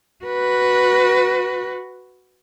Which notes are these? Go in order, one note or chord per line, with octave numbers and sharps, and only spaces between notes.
F#4 B4